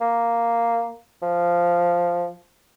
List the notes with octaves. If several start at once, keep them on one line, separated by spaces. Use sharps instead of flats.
A#3
F3